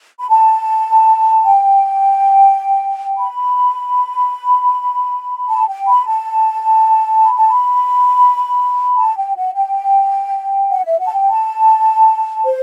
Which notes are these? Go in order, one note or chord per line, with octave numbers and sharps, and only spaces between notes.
B5
A5
G5
B5
A5
G5
B5
A5
B5
A5
B5
A5
G5
F#5
G5
F#5
E5
F#5
A5
G5
A5
C5